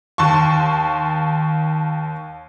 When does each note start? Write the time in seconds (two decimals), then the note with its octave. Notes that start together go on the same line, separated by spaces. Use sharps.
0.18 D#2 A5 C6 C#6